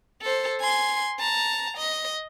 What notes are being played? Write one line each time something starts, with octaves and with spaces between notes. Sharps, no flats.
A4 C5
G#5 C6
A5 A#5
D#5